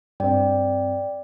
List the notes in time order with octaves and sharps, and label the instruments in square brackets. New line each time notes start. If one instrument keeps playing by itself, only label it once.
[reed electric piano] G2 C4 [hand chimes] D5 G5